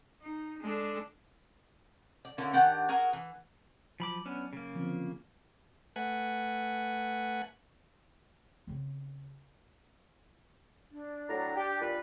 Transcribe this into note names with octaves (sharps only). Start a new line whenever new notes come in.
D#4
G#3 D4 A4
D5
D3 A#3 C#4 E4
D#3 D4 G4 F#5
F#4 G#4 A#4
E3
F3 F#3 B5 D6
B3 C#4 D4
C#3 A#3
D3 F3 C4
A3 B4 F#5 G#5
C#3 C4
D4
A2 F#3 A#5
G4
A#2 G3 B4